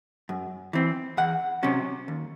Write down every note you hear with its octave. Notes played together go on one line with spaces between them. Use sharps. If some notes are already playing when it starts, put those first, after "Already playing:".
F#2
E3 C4
E2 F#5
C3 F#3 C#4
D#2